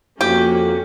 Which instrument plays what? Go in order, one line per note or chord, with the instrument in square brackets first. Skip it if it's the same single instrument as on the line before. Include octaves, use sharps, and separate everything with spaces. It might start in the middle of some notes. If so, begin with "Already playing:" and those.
[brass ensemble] F2 [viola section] A#3 C#4 F#4 [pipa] G4